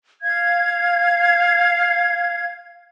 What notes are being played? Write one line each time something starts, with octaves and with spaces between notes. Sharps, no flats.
F5 G#6